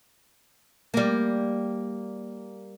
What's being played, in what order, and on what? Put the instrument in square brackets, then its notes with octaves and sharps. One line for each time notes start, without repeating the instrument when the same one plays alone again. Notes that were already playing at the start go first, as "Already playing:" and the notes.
[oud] G3 A#3